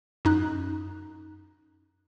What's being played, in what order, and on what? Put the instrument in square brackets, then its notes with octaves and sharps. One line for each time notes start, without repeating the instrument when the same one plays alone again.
[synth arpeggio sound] F#2 D#4 F#6